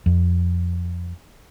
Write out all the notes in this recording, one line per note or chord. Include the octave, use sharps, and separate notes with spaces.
F2